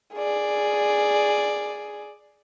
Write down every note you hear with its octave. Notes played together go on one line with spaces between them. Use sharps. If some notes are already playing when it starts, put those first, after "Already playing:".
G#4 D5